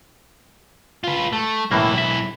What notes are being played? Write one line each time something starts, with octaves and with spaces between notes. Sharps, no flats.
F4 B4
A3
B1 A2 E3 A#3 E4
E5